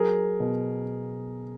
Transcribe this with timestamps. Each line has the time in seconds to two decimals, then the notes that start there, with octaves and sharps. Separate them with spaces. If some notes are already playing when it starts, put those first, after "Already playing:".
Already playing: F#3 G#4 A#4
0.40 B2